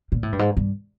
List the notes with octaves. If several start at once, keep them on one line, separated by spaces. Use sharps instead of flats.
A#2
A2
G2
G#2
G2